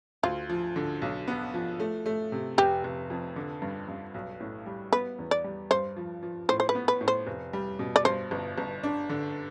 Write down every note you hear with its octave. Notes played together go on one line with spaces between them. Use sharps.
D2 F4
F3
D3
B1
B3
F3
A3
A3
C3
F1 G4
F1
F2
D3
G2
G2
B1
A2
G3
B3 B4
E2
D5
G3
G2 C5
F3
F3
A2 C5
C5
B4
B3
B4
A2
C5
F1
G3
B2
D5
G2 C5
G1
G1
D4
D3